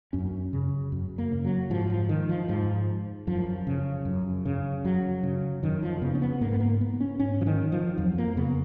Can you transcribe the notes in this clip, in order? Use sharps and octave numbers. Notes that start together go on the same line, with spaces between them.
F#2 C#4
C#3
F#2
A#3
C#3
F#3
G#2 F3
F3
D#3
F3
G#2 F3
F#2 F3
C#3
F#2
C#3
F#2 F#3
C#3
F#2 D#3
F3
C#3 B3
C#4
B3
G#2 A#3
B3
A#3
B3
C#4
G#2 C#4
F3
D#3
F3
F2 F#3
A#3
C#3 B3